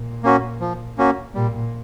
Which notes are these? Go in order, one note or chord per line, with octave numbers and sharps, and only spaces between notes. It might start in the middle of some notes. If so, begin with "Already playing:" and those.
Already playing: A#2
A#3 C#4 F#4
F3
A#3 C#4 F#4
A#2 G3